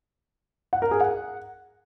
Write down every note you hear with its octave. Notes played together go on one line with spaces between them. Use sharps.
F#5
A#4
G#4
F#5